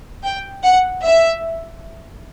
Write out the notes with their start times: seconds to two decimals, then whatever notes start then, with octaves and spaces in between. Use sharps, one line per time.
0.24 G5
0.63 F#5
1.03 E5